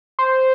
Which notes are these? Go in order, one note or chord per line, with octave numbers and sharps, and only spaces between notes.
C5